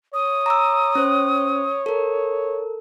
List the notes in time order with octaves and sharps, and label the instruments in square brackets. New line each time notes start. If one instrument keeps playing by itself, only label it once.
[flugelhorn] C#5 [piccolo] D#6
[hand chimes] A#5 D6 E6
C#4 C5
A4 A#4